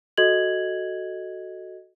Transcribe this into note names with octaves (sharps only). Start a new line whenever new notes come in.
F#4 A4 D#5 G#6 F#7